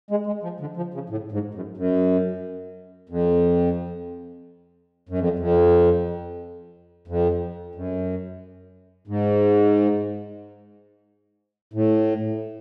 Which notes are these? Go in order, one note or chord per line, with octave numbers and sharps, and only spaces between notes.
G#3
G#3
F3
D3
F3
C#3
A2
G#2
F#2
F#2
F2
F#2
F2
F2
F2
F#2
G#2
A2